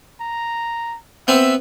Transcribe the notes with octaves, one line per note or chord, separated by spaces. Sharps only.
A#5
B3 C4 E5